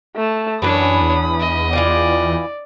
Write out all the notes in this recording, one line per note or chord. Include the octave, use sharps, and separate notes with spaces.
A3 A5
F#2 E3 D4 B4 C#5 B5 D#6
E2
D#5
E3 F4 D5 G5